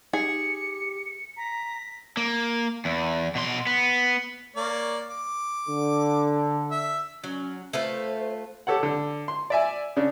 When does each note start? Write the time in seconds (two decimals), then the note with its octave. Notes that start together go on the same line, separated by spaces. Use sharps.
0.13 D#4 G4 G#4 C#7
1.36 A#5 B6
2.17 A#3
2.85 E2
3.35 B2 C6
3.67 B3
4.56 A#3 C#5 D5
5.08 D6
5.68 D3
6.71 E5
7.24 F#3 C#4
7.73 A3 F4 B4 C5
8.67 G4 A4 C#5 F#5
8.83 D3
9.28 C6
9.50 D5 E5 G#5
9.97 C#3 D4